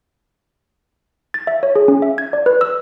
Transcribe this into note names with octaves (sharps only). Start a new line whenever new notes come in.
A6
E5
C#5
G#4
C#4
E5
G#6
D5
B4
E6